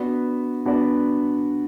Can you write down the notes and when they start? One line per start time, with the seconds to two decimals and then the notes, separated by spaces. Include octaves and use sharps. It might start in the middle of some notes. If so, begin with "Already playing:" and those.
Already playing: B3 D4 F#4 B4 D5
0.65 B3 D4 F#4 B4 D5